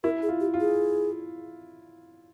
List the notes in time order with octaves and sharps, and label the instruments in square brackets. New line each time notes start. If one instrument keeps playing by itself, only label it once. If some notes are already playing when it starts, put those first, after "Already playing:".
[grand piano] E4 [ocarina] A#4
[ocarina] G#4
[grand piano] F4
[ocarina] G4
[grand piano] F4
[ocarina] G#4